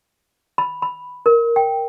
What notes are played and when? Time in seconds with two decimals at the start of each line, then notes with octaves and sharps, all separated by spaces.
0.58 B5
0.82 B5
1.26 A#4
1.56 G5